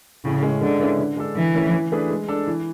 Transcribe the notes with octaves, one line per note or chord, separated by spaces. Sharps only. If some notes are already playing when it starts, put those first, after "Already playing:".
A2 C#3
G#3 C#4
D3 G#3
C#4 E4 B4
D3
G#3 D4 A4
D3 E3
A3 C#4 E4 B4
E3
A3 D4 G#4 B4
G#3
D4 A4
E3